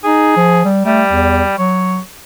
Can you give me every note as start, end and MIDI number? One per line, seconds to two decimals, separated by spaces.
0.04 0.36 63
0.04 0.65 68
0.37 0.62 53
0.64 0.82 55
0.85 1.54 55
0.85 1.02 57
1.12 1.42 40
1.58 1.98 54
1.58 1.99 73